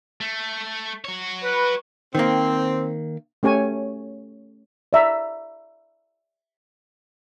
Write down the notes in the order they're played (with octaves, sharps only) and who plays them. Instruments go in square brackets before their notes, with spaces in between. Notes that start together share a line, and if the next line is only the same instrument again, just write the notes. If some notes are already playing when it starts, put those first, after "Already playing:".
[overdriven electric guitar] A3
F#4 C#5
[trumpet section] B4
[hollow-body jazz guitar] D#3 A#3 [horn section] C4
[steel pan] A3 C#4 G4 C#5 G#5
D5 E5 A#5